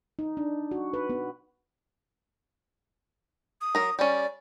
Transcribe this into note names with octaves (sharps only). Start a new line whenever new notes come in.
D#4
D4
F#4
B4
B3
D#6
F#3 A#4 A#5
G3 C#4 D5